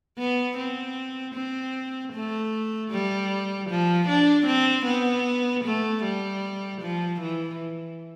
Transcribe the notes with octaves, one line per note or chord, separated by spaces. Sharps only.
B3
C4
C4
A3
G3
F3
D4
C4
B3
A3
G3
F3
E3